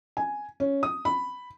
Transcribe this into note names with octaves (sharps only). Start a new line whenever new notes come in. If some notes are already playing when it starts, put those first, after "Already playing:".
G#5
C#4
D#6
B5